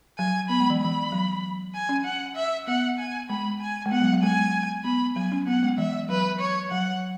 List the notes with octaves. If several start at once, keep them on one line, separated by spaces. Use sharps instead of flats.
F#3 G#5
B3 B5
G#3
E3
E3 B5
F#3
G#5
C#4
F#5
E5
B3 F#5
G#5
G#3 B5
G#5
G#3
B3 F#5
F#3
F#3
G#3 G#5
B3 B5
F#3 G#5
C#4
B3 F#5
G#3
E3 E5
F#3 B4
C#5
F#3 F#5